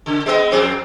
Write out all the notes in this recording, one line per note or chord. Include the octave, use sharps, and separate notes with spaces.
C#3
G#3 B3 D#5
F2 C4 G#4